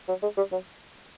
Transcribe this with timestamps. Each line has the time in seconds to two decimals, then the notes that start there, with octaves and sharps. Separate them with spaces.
0.08 F#3
0.22 G#3
0.37 G3
0.52 F#3